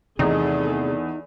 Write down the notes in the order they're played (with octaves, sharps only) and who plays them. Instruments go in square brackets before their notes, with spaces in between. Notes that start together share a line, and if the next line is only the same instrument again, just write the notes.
[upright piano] E2 [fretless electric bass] C3 D#3 A3 [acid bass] D#4 [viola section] G#4 A4